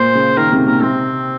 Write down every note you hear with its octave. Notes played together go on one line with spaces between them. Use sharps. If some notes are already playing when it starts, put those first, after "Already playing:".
Already playing: A#2 C5
C#3
D#3 A#4
C3
A#2 A#4
C3 C4